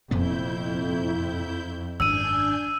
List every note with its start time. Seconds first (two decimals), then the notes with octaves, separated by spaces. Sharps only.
0.11 F1 F2 A#2 B3 E4 G6
2.00 G#1 F#2 D4 G#5 E6 G6 D#7